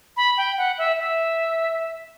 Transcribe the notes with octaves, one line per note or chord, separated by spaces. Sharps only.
B5
G5
F#5
E5
E5